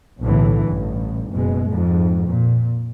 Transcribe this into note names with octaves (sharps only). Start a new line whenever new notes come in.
B1 A2 D3 E3
A1 G2
F#1 B2 G#3
F2 G#2
A#2